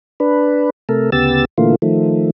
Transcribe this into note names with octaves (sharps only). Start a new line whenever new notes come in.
D4 B4
C3 A3 A4 A#4
D2 C#3 B3 G4 E6 A6
A#2 D3 E3 A3 A#3 F4
D#3 F3 A3